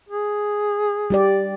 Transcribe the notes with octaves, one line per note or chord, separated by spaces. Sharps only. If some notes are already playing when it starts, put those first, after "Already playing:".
G#4
G3 G4 D5